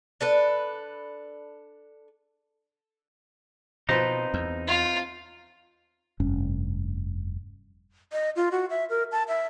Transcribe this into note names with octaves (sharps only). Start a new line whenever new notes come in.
D4 A4 B4
B2 F3 C4 D#4 B4
E2
F4
F1 G2 C#4
D#5
F4
F#4
E5
A#4
A5
E5